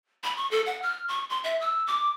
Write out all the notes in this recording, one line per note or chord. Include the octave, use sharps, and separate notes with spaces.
B5
C#6
A4
F#5
F6
C#6
C6
E5
E6
D6